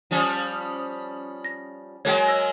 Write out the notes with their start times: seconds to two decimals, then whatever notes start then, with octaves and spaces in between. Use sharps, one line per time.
0.11 F3 G3 C#4
1.45 A#6
2.05 F#3 G#3 A#3 C#5 G5
2.28 C#5 E6 A#6